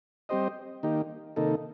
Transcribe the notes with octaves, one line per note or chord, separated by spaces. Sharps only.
G3 C4 G4 C5 D#5
D#3 A#3 D#4 G4
C3 D#3 A#3 D#4 A4